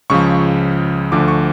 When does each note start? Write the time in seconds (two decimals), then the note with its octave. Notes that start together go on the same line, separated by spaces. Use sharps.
0.10 C#2 C#3 F3 C#6
1.12 D2 D3 F3 D6
1.28 C#6